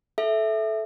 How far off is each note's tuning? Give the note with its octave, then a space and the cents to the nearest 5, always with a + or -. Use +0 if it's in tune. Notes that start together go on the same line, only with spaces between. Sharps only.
A4 -20 E5 +0